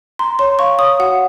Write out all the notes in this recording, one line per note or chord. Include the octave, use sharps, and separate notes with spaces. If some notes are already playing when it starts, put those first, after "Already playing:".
A#5 C6
C#5 C6
F5 C#6
C#5 D#6
F#4 F#5